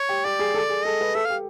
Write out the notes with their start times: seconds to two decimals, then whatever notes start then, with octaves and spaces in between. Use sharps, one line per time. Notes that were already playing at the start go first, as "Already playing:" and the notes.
Already playing: C#5
0.09 G4
0.24 G4 D5
0.39 G#4
0.54 A4
0.69 G#4
0.85 A4 D#5
1.01 B4
1.15 A4 E5
1.25 G4 F5